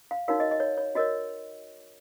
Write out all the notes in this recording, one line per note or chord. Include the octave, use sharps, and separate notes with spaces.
F5
D#4 F#4 A#4 C#5 F5
D#5
D#5
C#5
C#5
F#4 A#4 C#5 D#5